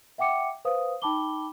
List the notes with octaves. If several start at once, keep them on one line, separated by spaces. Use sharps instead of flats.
E5 F#5 G5 D6 C#7
B4 C5 F5 D#6
D#4 G5 A5 B5 D6 G7